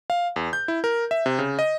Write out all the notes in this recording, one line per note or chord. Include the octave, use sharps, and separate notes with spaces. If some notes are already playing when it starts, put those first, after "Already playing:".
F5
E2
G6
E4
A#4
E5
C3
C#3
D#5